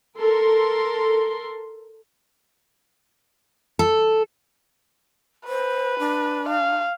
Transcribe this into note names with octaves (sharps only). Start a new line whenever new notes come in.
A4 A#4 C6
A4
B4 C5
D4
F5